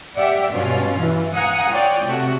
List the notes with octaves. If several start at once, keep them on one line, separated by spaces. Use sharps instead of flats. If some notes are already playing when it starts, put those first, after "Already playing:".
G4 D5 E5 F#5
G2 B2 C#4 F4
E3
F5 F#5 G#5 A#5 D#6 F#6
F4 C#5 D5 G5
C3 A3 F#4